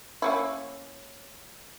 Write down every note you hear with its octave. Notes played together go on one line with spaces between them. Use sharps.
A#3 C#4 E4